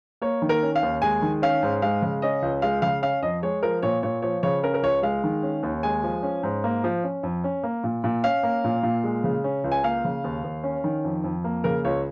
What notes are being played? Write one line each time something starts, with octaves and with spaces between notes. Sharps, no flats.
A#3 C#5
D#3
A#4
C#4
F5
D#2
G#3 G#5
D#3
C#4 F5
G#2
G#3 F5
C#3
C#4 D#5
C#2
G#3 F5
C#3 F5
C#4 F5
F2 D#5
G#3 C#5
F3 A#4
A#2 C#5
A#2 C#5
F3 C#5
C#3 C#5
C#4 A#4
A#4
C#2 C#5
G#3 F5
D#3
C#4
D#2
G#3 G#5
F3
C#4
G#2
A#3
F3
C#4
F2
C#4
A#3
A#2
A#2
C#4 F5
A#3
A#2
A#2
G#3
C#3
C#4
C#2
G#5
A#3 F5
C#3
D#2
D#2
C#4
D#3
F2
F2
A#3
C#3 A#4
C#2 C#5